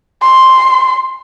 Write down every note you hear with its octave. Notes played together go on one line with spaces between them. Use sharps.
C6